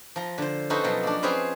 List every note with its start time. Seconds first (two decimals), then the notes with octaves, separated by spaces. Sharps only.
0.16 F3 A#5
0.38 D3 C5
0.70 C#4 D#4 F#4 A4 B4 C5
0.84 B2 F3 F#3
1.03 A#3 D4
1.23 C4 C#4 G#4 B4 C5 F5